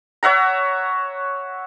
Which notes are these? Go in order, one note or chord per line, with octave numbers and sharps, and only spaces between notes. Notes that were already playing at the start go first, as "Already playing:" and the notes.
C#5 E5 F#5 A#5